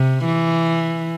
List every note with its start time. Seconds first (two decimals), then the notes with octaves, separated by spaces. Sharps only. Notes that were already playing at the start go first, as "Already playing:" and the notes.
Already playing: C3
0.25 E3